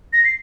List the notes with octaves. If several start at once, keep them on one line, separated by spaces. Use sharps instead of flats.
A#6
C7